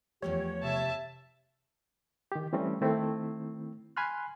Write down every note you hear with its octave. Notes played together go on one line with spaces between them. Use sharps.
E2 F3 A3 G4 C#5
C3 E5 A5
D#3 G4
E3 G3 A3 C4 C#4
D#3 A3 C4 E4
G#5 B5 C6 F6 F#6